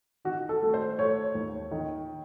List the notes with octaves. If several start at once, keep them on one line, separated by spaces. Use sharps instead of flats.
D#3 F#4
A4
A3
C5
A3 C#5
D#2
D#3